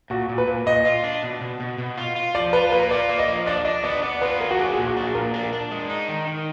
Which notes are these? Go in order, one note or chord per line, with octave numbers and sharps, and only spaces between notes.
A#2 F#4
A#2
B4
A#2
A#2 D#5
F4
D4
B2
B2
B2
B2
F4
F4
F3 D5
F4 B4
A#3 B4
F4 D5
A#3
D#5
F3
D4 D5
D4 D#5
B3 D5
B3 D5
F4 B4
F#3 A#4
F#4
D4 G#4
G#4
A#2
F#4
D4 G#4
A#2 A#4
D4
A#4
D4
G#3
D#4
D#3
D#3